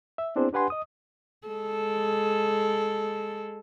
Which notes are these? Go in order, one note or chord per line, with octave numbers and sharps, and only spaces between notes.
E5
B3 C4 D4 E4 G#4 C5
D4 G4 B4 F#5 G#5 C6
D#5 D#6
G#3 A4